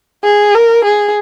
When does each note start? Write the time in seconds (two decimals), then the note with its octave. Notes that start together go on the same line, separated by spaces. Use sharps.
0.24 G#4
0.54 A#4
0.85 G#4